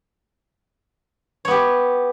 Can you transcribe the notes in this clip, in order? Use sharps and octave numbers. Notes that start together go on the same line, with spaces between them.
B3 G4 C#5